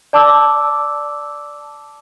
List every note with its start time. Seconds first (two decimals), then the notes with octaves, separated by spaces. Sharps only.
0.13 D5 A5 D6 E6